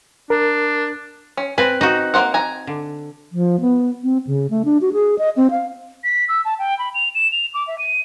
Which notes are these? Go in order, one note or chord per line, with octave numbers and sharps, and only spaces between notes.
D4 A#4
C#4
C4 B4 G#5
D#4 F#4
A#3 C5 F#5
G#5 A#5
D3
F3
B3
C4
C#3
A3
D4
F#4
G#4
D#5
C4
F5
B6
E6
A5
G5
B5
F7
E7
F7
D6
E5
D#7